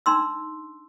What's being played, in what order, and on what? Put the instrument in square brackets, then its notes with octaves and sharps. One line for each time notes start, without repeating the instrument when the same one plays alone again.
[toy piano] D4 D#4 C6 E6